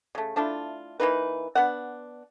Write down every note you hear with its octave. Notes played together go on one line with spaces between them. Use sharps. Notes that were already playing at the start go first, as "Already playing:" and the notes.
C#3 A3
A3 D4 E4 F4
E3 A#3 D#4 B4
B3 D4 F#5